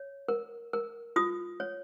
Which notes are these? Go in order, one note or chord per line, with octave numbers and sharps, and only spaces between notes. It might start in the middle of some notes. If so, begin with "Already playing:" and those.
Already playing: C#5
A#4
A#4
F4 D#6
C#5